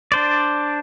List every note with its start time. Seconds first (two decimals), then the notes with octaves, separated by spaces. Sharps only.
0.12 D4 C5 D5